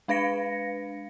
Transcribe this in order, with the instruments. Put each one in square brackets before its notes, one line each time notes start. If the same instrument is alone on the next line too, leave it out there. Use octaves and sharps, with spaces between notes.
[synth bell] G#3 D4 B4 F5 A#6 C#7